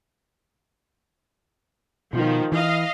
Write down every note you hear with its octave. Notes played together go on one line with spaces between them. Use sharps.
B2 D#3 F3
E3 D#5 F5